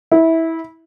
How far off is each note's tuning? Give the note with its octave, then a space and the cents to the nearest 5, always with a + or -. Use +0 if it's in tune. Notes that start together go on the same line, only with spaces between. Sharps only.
E4 -20